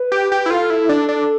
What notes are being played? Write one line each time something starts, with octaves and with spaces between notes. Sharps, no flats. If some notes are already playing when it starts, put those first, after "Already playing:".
Already playing: B4
G4
G4
E4
F4 A4
E4
D4
D4